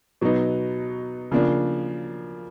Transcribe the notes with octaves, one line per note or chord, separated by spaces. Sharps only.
B2 F#3 B3 D#4
C#3 F3 A#3 D4